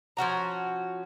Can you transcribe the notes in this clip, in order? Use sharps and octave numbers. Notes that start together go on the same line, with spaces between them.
F3 C#4 F#4 A#5